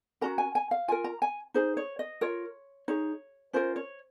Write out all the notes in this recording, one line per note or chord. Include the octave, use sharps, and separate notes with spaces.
C#4 F#4 A#4 A#5
G#5
G#5
F5
F4 A#4 G#5
A#5
G#5
D#4 G#4 C5
C#5
D#5
F4 A#4 C#5
D#4 G#4 C#5
C#4 F4 A#4 C5
C#5